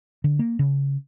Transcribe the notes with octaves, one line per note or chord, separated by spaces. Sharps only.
D3
A#3
C#3